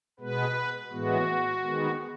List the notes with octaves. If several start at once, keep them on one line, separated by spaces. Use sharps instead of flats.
B2 G#3 B3 B4
A2 E3 G#3 B3 F#4
D#3 G#3 B3